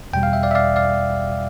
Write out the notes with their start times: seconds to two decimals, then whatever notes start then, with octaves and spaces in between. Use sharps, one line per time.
0.13 E2 B2 G3 G5
0.23 F5
0.33 E5
0.43 D5 F5
0.51 E5
0.55 D5 F5
0.76 D5 F5